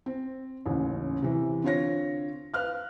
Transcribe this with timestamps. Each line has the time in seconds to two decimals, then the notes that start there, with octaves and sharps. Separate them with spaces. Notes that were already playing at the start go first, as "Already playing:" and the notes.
0.06 C4
0.66 A1 D#2 C#3
1.22 C3 E3
1.63 D3 C4 F4 C#5 A#6
2.54 B4 F5 F6 F#6